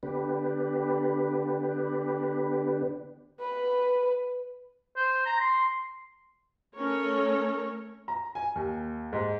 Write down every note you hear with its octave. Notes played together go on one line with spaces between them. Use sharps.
D3 B3 D4 G4 B4
B4
C5
A#5
C6
A3 C#4 A#4 C#5
A#5
G#5
D#2
G#2